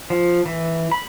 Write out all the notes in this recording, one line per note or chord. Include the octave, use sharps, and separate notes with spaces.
F3
E3
B5